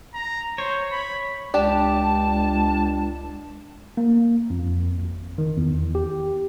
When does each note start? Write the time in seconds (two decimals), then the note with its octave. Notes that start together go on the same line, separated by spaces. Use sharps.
0.14 A#5
0.58 C5 C#5
0.91 B5
1.54 C#2 D4 G4 A5
3.97 A#3
4.50 F2
4.99 G#1
5.38 D#3
5.57 E2
5.95 G4